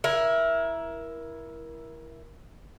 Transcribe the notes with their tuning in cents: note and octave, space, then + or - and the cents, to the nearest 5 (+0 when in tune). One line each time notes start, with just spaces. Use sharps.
E4 +5 A#4 +25